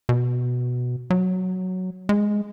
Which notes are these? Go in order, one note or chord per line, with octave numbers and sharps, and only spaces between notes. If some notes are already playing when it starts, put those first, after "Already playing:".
B2
F#3
G#3